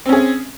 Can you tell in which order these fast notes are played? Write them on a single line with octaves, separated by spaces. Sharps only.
C4 C#4 G#4